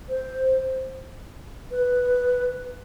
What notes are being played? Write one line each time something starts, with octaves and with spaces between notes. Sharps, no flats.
C5
B4